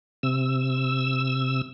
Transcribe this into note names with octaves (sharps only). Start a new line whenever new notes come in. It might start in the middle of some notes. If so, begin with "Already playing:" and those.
C3 E6